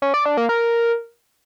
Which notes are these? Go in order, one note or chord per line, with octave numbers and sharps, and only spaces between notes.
C#4
D5
D4
A#3
A#4